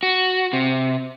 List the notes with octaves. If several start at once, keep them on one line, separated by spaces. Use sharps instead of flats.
F#4
C3